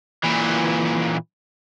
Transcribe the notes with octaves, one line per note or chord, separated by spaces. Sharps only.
A#2 E3